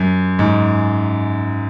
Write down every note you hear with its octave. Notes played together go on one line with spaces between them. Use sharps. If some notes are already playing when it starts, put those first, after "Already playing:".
Already playing: F#2
G#2